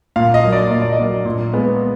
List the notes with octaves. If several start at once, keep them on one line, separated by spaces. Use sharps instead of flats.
A#2 F5
D#5
F#3 A#3
D5
A#2 D#5
D5
D#5
F#3 A#3
A#2
G#3 B3